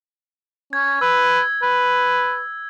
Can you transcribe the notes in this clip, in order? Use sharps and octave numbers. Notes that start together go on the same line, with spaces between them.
C#4 G#6
B4 E6
B4